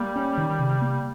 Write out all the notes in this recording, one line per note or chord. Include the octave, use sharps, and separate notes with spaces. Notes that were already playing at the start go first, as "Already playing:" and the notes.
Already playing: G3 A#3
C#4
D#3
C3
A#3